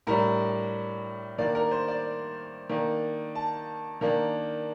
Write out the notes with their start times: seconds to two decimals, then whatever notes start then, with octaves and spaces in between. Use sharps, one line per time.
0.07 A2 G3 D4 A#4
1.38 D#3 A#3 D4 D5
1.55 A#4
1.71 C5
1.88 D5
2.70 D#3 A#3 D4
3.35 A5
4.01 D#3 A#3 D4